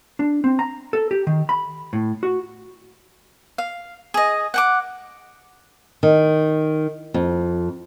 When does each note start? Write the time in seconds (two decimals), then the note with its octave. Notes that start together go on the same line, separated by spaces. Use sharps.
0.19 D4
0.44 C4
0.59 A#5
0.93 A4
1.11 G4
1.27 D#3
1.49 B5
1.93 A2
2.23 F#4
3.58 F5
4.14 G#4 D#5
4.54 F#5 G5 D6
6.03 D#3
7.14 F2